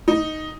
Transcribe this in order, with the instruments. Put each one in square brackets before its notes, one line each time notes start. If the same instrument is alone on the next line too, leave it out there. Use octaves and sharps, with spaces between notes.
[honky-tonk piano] D#4